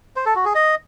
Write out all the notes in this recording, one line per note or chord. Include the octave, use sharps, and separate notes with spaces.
C5
A4
F#4
G#4
D#5